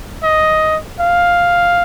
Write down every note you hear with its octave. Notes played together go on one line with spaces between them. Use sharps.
D#5
F5